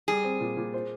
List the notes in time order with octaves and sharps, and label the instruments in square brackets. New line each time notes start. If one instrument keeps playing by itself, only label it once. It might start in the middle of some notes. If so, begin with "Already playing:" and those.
[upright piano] G3 [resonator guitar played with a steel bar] G#4
[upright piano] C4
A#2
A#2
C5